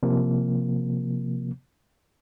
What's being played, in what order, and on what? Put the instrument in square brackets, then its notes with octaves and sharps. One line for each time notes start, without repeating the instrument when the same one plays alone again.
[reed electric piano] C3 F3 A#3